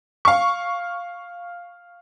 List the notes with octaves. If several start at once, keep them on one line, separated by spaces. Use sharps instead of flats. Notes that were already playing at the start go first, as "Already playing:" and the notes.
F5 C#6